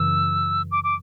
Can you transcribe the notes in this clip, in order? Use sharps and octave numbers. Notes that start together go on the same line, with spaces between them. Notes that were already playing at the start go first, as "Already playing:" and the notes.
Already playing: F#2 C#3 E3 E6
D6
D6